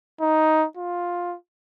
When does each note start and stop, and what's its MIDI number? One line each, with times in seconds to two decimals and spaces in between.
0.21 0.66 63
0.77 1.36 65